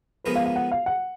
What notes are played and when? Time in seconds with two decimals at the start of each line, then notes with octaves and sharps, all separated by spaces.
0.24 F3 G#3 B3 D#4 A#4 B4
0.36 F5
0.46 F5
0.56 F#5
0.72 F5
0.86 F#5